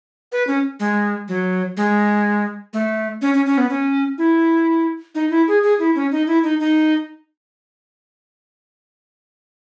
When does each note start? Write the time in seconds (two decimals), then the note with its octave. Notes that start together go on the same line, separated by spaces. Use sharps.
0.32 B4
0.47 C#4
0.80 G#3
1.28 F#3
1.77 G#3
2.73 A3
3.22 C#4
3.34 C#4
3.46 C#4
3.58 B3
3.70 C#4
4.18 E4
5.15 D#4
5.30 E4
5.48 G#4
5.63 G#4
5.79 E4
5.96 C#4
6.12 D#4
6.27 E4
6.44 D#4
6.60 D#4